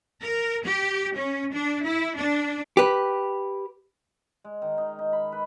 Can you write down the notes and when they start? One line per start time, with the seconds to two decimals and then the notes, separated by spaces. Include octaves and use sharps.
0.22 A#4
0.65 G4
1.16 C#4
1.53 D4
1.84 E4
2.17 D4
2.77 G4 B4
4.44 G#3
4.62 D#3
4.78 D#4
4.99 D#4
5.13 B5
5.32 B4